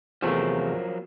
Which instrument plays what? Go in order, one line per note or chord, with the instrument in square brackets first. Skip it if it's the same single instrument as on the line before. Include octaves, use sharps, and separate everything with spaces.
[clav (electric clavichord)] E2 C3 A3 [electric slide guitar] F3 F#3 A#3